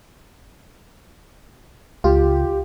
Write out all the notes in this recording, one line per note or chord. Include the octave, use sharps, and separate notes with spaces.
C#2 F4 G4